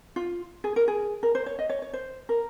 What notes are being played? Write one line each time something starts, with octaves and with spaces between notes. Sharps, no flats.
F4
G#4
A#4
G#4
A#4
C5
C#5
D#5
C#5
C#5
C5
A#4